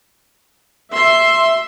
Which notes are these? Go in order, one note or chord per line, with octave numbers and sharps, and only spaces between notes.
E5 C6